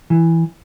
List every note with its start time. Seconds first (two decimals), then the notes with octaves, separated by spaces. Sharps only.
0.10 E3